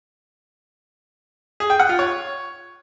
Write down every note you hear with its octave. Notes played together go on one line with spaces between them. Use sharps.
G#4
G5
F#5
F4
C#5